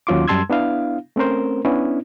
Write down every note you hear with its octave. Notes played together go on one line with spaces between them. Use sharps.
D#2 F#3 C#4 F4 C6 D6
F#2 G3 A5 C6 E6 G#6
B3 D4 E4 F5
A3 C4 C#4 A#4 C5
B3 C#4 D4 E4